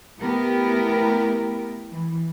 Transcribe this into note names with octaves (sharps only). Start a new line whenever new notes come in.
A3 B3 E4 G4 A#4
E3